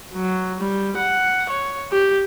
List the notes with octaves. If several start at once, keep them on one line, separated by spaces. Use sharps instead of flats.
F#3
G3
F#5
C#5
G4